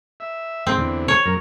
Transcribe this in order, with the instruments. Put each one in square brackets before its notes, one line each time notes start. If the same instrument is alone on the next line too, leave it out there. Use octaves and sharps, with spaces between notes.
[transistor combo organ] E5
[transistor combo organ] G#2 [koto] C4
[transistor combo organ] E2 D3
[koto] C#5
[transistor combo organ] F#2 A#4